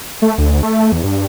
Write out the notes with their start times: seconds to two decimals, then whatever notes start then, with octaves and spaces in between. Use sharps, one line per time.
0.22 A3
0.38 D2
0.63 A3
0.92 E2
1.04 G2